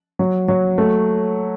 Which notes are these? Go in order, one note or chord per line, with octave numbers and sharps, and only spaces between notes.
F#3
F#3
A3